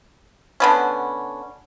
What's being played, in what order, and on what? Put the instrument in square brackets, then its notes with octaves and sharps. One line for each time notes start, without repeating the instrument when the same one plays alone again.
[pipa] D3 B3 C#4